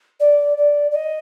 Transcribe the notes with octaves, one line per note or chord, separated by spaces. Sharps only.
D5
D5
D5
D#5